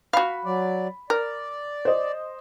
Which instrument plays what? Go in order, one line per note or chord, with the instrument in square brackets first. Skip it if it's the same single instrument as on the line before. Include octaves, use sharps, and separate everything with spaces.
[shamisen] F#4 F5 [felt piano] B5
[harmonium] F#3 D5
[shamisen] A#4 [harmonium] D5
[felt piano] C5 D#5